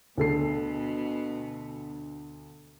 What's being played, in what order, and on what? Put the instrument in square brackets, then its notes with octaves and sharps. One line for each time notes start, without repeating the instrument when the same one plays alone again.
[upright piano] D2 A4 C7 [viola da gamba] B2